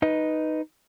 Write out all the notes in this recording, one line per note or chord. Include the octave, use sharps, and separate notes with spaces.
D#4 B4 D#5